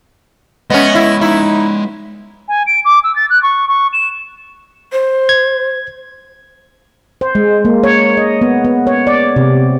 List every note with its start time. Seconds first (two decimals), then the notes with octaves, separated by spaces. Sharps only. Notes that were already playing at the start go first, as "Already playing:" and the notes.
0.70 G#3 B3 C#4 D#5 E5
0.95 E4
1.21 D#4 E4
2.48 G#5
2.66 D7
2.85 D6
3.03 E6
3.15 A6
3.30 F#6
3.42 C#6
3.68 C#6
3.93 E7
4.92 C5
5.29 G#6
7.21 C5
7.35 G#3
7.65 A#3
7.83 C#5
8.17 D#5
8.42 B3
8.65 B3
8.87 C#5
9.07 D5
9.36 C3